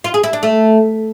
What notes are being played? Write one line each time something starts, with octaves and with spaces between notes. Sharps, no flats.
F4
G#4
E4
D4
A3